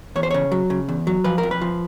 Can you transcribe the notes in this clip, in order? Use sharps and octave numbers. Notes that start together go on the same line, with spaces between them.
E2 C#5
C5
C#3 C#5
F#3
C#3
E2
F#3
F3 B4
A#4
F2
B4
F3